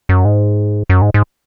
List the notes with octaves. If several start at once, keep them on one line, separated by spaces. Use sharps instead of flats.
F#2
G#2
F#2
G#2
G#2